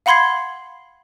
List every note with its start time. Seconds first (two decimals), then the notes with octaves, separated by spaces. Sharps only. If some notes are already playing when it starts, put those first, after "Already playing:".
0.06 F5 F#5 B5 C6 G#6 C7